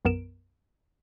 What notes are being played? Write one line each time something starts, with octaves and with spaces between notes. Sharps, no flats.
B1 F#2 B3 A#4 D7 E7